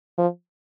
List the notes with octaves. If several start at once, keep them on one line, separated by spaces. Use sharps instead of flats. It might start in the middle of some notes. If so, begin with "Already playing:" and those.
F3